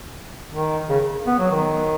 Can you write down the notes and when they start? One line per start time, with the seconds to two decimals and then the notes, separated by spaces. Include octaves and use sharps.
0.51 D#3
0.89 C#3
1.27 B3
1.39 F#3
1.51 D#3